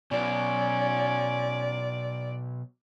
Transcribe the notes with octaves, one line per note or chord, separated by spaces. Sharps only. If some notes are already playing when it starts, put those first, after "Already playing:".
B2 F#3 C#4 D5